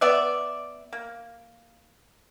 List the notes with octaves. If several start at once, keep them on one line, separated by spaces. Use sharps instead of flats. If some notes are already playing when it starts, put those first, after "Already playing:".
B3 D5 E5
A#3